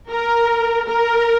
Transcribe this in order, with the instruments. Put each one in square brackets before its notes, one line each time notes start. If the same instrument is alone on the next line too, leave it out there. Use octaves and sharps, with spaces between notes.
[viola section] A#4
A#4